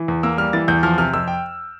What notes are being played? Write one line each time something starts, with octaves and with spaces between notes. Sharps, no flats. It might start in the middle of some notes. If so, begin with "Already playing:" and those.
Already playing: E3
E2
A#3 E6
G3 F6
E3 A6
E2 G6
F3 F6
C3 F6
F2 E6
G5